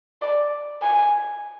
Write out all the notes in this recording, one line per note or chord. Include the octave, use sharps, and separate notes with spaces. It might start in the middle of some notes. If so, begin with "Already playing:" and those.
D5
G#5